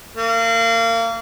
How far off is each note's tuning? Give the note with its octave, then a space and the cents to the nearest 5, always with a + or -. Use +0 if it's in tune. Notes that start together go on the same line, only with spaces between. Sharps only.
A#3 -30